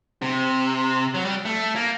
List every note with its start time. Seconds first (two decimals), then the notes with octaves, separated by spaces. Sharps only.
0.22 C3
1.14 F#3
1.25 G3
1.45 A3
1.76 A#3